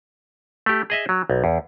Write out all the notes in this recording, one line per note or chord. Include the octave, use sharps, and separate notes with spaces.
A3 G4
G#4 D#5 E5
F#3
B1
E2